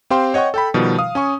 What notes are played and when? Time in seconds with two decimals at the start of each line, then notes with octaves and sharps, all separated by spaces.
0.10 C4 G4 C5 F5 G5 C6
0.34 C#5 D#5 F#5 G5 C#6
0.54 A4 G5 B5
0.74 B2 D#3 F3 G3
0.99 F5 D#6
1.15 C#4 G#5 C#6